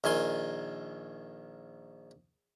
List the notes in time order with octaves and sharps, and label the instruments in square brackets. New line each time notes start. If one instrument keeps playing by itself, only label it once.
[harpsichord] A#1 D#3 G#5 C6